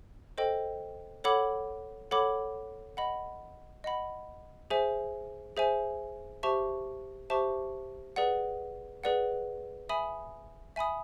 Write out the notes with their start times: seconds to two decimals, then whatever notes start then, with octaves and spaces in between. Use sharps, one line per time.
0.38 A4 C5 D#5 G5
1.24 A4 C#5 F#5 B5 D6
2.11 A4 C#5 F#5 B5 D6
2.97 D#5 F#5 B5
3.84 D#5 F#5 B5
4.70 G#4 C5 E5 G#5
5.57 G#4 C5 E5 G#5
6.43 G4 C5 E5 A5 C#6
7.30 G4 C5 E5 A5 C#6
8.16 G#4 B4 D5 F#5
9.04 G#4 B4 D5 F#5
9.89 E5 G#5 B5 D#6
10.76 E5 G#5 B5 D#6